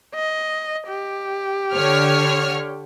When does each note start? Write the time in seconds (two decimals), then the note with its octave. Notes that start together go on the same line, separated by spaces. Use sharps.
0.15 D#5
0.88 G4
1.73 D3 C#5 F6